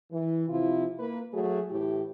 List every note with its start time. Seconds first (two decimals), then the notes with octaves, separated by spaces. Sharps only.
0.11 E3
0.49 C3 F3 E4 F4
0.98 A#3 B4
1.33 F#3 A3 F#4 G#4
1.70 A2 E3 E4 G4